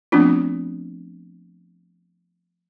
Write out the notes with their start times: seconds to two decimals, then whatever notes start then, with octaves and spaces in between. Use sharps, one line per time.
0.12 F3 A3 B3 C4 D4 F4